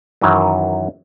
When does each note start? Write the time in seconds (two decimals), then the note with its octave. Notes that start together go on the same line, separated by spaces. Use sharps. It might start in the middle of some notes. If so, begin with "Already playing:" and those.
0.21 F#2 D#3 E3 F#3